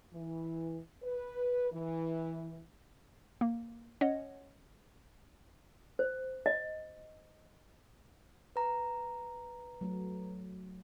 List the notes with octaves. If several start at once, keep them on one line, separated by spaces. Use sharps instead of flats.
E3
B4
E3
A#3
C#4 C#5 D#5 F#5
C5
D#5
B4 A#5
F#3 A3 F#4